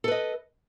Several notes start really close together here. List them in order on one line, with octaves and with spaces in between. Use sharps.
A4 B4 D#5